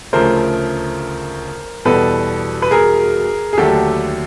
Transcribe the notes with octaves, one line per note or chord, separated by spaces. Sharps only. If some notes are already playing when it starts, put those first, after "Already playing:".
D2 C#3 F3 A3 A#4 C5
E2 B2 G3 A4 B4
B4
G#4 A#4
G#4
D#2 D3 F#3 A3 G4 A4